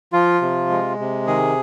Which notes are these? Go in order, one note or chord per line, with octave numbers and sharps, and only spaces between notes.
F3 F4
C3
G#3
C3
D#3 G#4